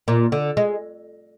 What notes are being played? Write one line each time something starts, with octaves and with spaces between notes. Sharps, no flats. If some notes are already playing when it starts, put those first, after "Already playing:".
A#2
D3
G#3